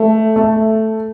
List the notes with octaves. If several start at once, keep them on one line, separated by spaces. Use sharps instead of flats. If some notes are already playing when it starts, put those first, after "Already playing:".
Already playing: A3
A3